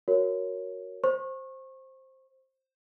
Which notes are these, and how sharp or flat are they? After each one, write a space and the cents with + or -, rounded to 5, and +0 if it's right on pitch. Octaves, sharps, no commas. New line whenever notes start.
F#4 +0 A#4 +0 C#5 +0
C5 +5 C#6 -25